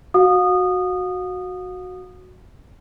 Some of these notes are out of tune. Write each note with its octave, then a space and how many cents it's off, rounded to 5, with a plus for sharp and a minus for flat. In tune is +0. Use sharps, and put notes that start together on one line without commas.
F#4 -10 F5 +40 D#6 -20